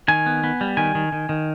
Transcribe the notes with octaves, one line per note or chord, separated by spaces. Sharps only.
D#3 G#5
B3
B3
G3
D#3 G#5
D#3
D#3
D#3